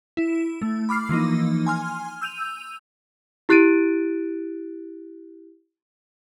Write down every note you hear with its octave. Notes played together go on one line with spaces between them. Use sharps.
E4
A3
B5 D6 F6 C7
E3 F3 A#3 D#4
G#5 C6 F6
E6 G6 D#7 F7
E4 G4 F#6 A6 D7 D#7